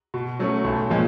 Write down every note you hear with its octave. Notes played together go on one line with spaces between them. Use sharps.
B2
F#3 A3 C#4
B1
A#2 F3 G#3